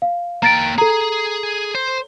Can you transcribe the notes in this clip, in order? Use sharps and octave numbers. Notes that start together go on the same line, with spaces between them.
F5
A#3 G5 A#5 A6 D7
G#4 A4 A#5
C5